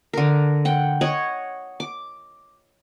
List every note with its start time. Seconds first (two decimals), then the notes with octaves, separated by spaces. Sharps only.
0.13 D3 A#4
0.65 F#5 G5
1.01 C#5 D#5 F#5
1.80 D6